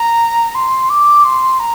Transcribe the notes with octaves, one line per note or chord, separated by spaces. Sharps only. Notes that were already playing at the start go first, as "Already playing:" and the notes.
Already playing: A#5
C6
D6
C6
A#5